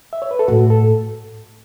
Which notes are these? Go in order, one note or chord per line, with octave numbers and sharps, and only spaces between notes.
E5
C#5
B4
A4
A2 F#4
A4